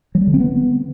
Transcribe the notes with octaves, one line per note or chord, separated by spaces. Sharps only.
F#3
G3
D3
C4
B3